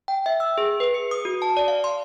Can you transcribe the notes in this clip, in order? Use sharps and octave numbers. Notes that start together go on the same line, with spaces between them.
G5
E5
E6
G#4
B4
C#7
D#6
F#4
A5
D5
F5
C6